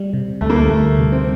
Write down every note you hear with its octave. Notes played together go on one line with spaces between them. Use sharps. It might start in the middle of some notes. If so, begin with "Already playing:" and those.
Already playing: G3
C3
D2 A3
A#3
A3
D2 A3
C3
C4